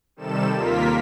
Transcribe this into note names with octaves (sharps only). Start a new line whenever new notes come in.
C3 D#3 G3 A4 E7
D#2 A#3 F4 A#4 B6